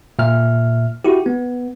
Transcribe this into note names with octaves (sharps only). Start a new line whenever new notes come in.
A#2 E5 F6
E4 F#4 G4
B3